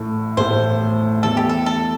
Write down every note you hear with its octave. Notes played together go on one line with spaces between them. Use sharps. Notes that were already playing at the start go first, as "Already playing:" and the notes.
Already playing: A1 A2 A3
A1 A2 A3 C5
E2 E3 A3 A4
G4
A4
A4